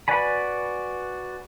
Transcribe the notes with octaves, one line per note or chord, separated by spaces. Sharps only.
F#4 B4 D5 G#5 B5